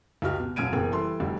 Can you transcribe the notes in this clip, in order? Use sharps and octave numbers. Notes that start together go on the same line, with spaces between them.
C#2 F#4 G4 F6
B2
E1 F#2 F6 G#6 D7 D#7
F#1 B2 E3 A#3 G#4 G5
E3 G3 A4 C6
F1 D2 G3 G4